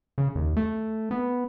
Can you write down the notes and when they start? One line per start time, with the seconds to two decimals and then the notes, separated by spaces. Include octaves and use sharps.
0.18 C#3
0.35 D#2
0.57 A3
1.11 B3